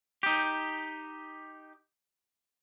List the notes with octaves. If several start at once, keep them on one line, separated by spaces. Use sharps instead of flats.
D#4 G4